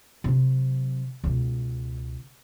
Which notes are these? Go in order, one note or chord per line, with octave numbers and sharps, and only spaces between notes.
C3 F#3
C#2 B2